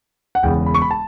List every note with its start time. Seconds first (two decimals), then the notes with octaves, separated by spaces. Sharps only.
0.35 F#5
0.43 E1 E2 C#3 G5
0.66 B5
0.74 C#6
0.82 B5
0.91 A5